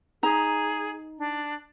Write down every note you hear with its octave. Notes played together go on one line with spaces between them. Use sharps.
D#4 G#4 A#5
D4